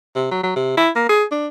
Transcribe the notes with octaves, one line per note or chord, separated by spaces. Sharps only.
C3
F#3
F#3
C3
E4
A#3
G#4
D4